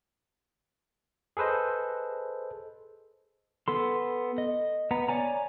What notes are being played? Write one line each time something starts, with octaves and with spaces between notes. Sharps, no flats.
G#4 A4 B4 C5 D#5
B3 A4 C6
D#5
B3 A#5
C#5 D5 G#5 A#5